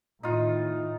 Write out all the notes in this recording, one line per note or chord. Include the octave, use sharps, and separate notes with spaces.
A2 D#3 D#4 F4